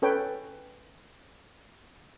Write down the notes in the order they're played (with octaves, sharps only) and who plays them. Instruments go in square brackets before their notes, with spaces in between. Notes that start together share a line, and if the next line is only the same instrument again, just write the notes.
[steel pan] C#4 A4 B4 C#5 G5